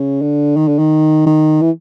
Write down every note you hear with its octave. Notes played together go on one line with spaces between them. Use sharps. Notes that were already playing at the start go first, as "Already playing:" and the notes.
Already playing: C#3
D3
D#3
D3
D#3
D#3
E3